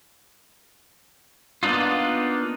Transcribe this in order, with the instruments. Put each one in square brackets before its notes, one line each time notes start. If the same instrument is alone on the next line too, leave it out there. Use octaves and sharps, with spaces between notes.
[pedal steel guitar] A#3 B3 D4 D#4 F4